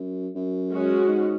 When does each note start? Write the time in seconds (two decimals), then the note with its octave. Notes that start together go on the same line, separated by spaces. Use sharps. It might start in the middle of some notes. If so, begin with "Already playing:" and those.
Already playing: F#2
0.35 F#2
0.72 G#3 C#4 F#4
1.08 G#2